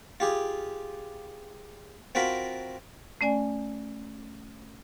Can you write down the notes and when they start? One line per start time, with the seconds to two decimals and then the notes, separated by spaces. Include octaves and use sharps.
0.20 F4 G4 G#4
2.15 C4 F4 F#4 A#4 B5
3.21 A3 C#4 D5 G#5